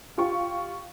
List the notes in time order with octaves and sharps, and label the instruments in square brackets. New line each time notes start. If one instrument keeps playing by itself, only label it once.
[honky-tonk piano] F4 G4 F5 C#6